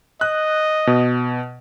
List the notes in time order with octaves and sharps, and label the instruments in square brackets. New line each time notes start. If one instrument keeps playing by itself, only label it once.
[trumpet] D#5 [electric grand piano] F#6
[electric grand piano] B2